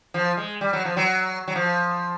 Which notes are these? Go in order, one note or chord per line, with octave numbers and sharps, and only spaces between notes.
F3
G#3
G3
F#3
F3
F#3
F#3
F3